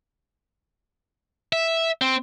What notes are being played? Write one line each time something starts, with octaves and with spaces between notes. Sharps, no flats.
E5
C4